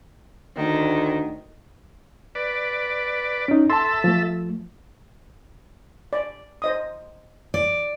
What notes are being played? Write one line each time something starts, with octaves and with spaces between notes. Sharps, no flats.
D2 D#3
B4 D5
C#4 D#4
A4 E5 A5 C6
F3 A3
D5
C5 D#5 D#6
D5